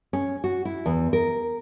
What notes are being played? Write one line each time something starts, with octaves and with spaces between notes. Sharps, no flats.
C#4
F#4
E4
E2
A#4